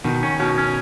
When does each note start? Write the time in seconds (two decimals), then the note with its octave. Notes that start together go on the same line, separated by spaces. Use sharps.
0.04 B2 D#3
0.23 C#4
0.39 B2 C#4
0.58 C#4